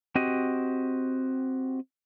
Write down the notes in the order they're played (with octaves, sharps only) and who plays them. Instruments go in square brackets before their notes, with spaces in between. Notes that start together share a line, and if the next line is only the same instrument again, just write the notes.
[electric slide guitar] C4 F#4 G4 D#5